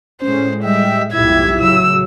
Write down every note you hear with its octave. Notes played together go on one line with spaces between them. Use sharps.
A2 G#3 C#4 C5
G3 D#5 E5 G5
F1 B1 G#2 E4 F4 G4 E5 G#6
A1 C#3 F#3 E6